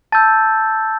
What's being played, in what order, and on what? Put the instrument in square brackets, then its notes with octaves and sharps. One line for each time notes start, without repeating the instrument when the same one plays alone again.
[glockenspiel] A5 E6 G6 A6